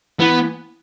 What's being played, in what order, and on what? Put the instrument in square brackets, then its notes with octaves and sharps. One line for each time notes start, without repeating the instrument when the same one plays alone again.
[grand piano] E3 [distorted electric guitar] B3